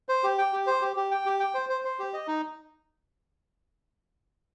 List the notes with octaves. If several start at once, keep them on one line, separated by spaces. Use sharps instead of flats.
C5
G4
G5
G4
C5
G4
G4
G5
G4
G5
C5
C5
C5
G4
D#5
D#4